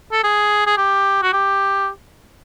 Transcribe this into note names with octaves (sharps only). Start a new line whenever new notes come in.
A4
G#4
G#4
G4
F#4
G4